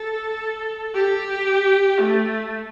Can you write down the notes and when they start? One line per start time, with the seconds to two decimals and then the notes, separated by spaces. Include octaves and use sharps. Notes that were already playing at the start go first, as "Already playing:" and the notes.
Already playing: A4
0.95 G4
2.00 A3